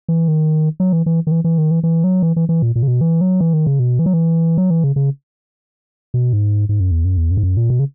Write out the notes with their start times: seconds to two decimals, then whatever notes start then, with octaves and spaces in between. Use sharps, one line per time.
0.09 E3
0.28 D#3
0.80 F#3
0.93 E3
1.06 E3
1.27 D#3
1.31 E3
1.44 E3
1.58 D#3
1.71 E3
1.83 E3
2.04 F#3
2.22 E3
2.36 E3
2.49 E3
2.62 A#2
2.76 A#2
2.83 C#3
2.88 B2
3.01 E3
3.21 F#3
3.41 E3
3.53 D#3
3.67 C#3
3.79 B2
3.99 E3
4.06 F#3
4.13 E3
4.57 F#3
4.70 E3
4.84 C#3
4.96 C#3
6.14 B2
6.33 G#2
6.69 G#2
6.80 F#2
6.91 E2
7.05 F#2
7.17 E2
7.31 F#2
7.37 G#2
7.43 F#2
7.57 A#2
7.70 B2
7.79 C#3